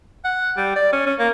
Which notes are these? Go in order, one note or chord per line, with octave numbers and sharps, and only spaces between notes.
F#5
G3
D5
C#4
C#4
A#3